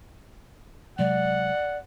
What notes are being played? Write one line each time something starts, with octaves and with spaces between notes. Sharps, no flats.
C3 F#3 G#3 D5 F#5